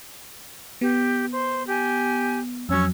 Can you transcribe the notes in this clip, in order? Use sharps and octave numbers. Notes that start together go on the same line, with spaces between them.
B3 G4
C5
G4 G#5
F2 F#3 C#4 C#6 E6